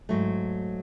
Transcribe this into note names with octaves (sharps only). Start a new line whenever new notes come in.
G#2 F#3 A3